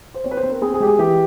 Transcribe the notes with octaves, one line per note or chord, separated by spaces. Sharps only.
C5
C4 C#5
B4
C5
C4
A#4
C4 G#4
G#4
G#3 G4
G#4
E3 G4